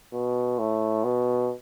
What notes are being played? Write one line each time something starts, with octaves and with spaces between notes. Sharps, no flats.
B2
A2
B2